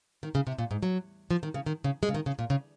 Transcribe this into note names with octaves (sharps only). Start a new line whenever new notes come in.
D#3
C#3
C3
A#2
G#2
F#3
F3
D#3
C#3
D#3
C#3
G#3
C#3
D#3
C#3
A#2
C#3